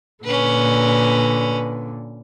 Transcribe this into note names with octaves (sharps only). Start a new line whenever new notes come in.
A#2 D3 C#4 B4